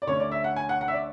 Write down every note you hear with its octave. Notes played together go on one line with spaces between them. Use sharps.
D5
D2 D3 A3 C#4 C#5
D5
E5
F#5
G#5
F#5
F#5
E5
D5